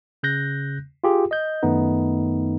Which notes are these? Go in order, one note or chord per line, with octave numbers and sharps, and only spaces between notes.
C#3 F#6 G6 A#6
F4 G4 G#4
D#5 G6
F#2 D#3 A3 B3 D#4